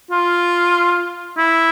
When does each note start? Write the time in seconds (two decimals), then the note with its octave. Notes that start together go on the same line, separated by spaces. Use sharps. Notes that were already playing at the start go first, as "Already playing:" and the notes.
0.11 F4
1.37 E4